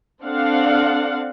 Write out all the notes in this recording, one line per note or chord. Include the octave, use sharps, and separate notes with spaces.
C4 D4 A4 F5 F#5